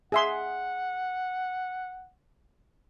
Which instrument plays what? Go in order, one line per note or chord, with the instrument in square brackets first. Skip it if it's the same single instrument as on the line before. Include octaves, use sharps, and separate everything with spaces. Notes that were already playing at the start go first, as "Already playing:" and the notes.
[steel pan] G#4 E5 C6 [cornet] F#5